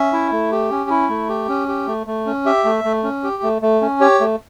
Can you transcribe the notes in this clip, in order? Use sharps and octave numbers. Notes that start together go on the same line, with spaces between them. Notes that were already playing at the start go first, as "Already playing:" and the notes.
Already playing: C#4 E5
E4
A3
G4
C#4
E4
A3
G4
C#4
G4
A3
A3
C#4
G4 E5
A3
A3
C#4
G4
A3
A3
C#4
G4 C#5
A3